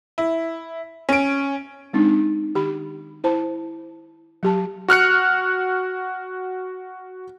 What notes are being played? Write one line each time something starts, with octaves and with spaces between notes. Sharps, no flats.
E4
C#4 D7
G#3 C4 D4 D#4
D#3 G4 B5
E4 C5 A5 B5
F#3 G4 A5
F#4 F6 F#6 C#7